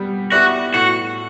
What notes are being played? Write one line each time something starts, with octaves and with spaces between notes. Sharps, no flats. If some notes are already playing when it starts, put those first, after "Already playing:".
Already playing: G3 B3 G4
B3 E4 F#4 G4 D5
A2 F#4